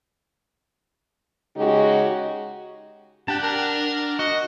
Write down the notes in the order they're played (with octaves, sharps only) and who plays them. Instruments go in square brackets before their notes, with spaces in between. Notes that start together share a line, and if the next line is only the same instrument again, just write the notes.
[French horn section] C#3 G#3 D#4 F#4 G4
[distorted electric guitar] D4 [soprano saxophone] G4 [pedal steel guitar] F#5 A5
[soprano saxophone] A#4
[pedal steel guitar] F#4 [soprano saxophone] D#5